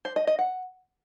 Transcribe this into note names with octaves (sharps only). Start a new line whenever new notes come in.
C5
D#5
D#5
F#5